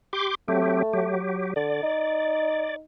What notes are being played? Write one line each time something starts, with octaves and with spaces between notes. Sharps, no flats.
G4 C6 D6
F#3 A3 C4 G4
F#3 G4
D3 D5
D#4